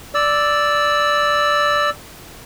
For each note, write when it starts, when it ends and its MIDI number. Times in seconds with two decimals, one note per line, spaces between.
0.15 1.90 74
0.15 1.90 88